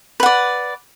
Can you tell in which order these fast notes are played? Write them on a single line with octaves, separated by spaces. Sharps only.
B4 F#5 D5